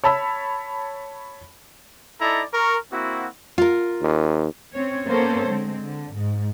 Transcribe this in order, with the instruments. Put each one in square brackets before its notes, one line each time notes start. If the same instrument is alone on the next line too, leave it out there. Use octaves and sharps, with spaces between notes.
[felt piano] C#5 A5 B5 E6
[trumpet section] D#4 E4 A4 D5 A#5
A#4 C#6
A#3 C4 E4 F#4
[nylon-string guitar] F4 A#4
[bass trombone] D#2
[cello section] C4 C#4 C#5
A#3 B3 C#4 A4 C5 C#5
D3 G#3 C4
D3
G#2